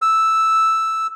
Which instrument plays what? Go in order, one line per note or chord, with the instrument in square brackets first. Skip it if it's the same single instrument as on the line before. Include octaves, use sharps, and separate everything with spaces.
[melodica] E6